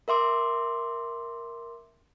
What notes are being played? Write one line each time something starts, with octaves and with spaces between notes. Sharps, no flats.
A#4 E5 C6 D6